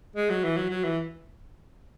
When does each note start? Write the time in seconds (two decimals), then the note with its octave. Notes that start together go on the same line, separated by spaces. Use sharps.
0.16 G#3
0.30 F#3
0.44 E3
0.56 F#3
0.70 F#3
0.84 E3